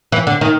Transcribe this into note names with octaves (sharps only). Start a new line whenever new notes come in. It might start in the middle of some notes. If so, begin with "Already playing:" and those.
E3
D3
D#3